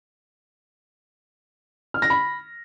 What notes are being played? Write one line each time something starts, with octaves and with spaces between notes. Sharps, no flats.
F6
A#6
B5